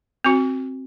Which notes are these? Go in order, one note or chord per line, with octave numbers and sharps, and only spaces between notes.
C4 F#4